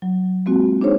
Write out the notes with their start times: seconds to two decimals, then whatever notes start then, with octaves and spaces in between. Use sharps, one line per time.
0.02 F#3
0.46 G#3 A#3 C4 F4 F#4
0.81 D4 D#4 G#4 C5 C#5